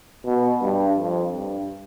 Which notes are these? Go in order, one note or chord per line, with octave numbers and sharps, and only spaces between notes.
B2
G2
F2
G2